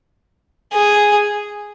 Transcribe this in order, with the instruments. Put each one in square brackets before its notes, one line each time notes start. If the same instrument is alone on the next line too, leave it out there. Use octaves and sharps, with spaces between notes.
[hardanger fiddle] G#4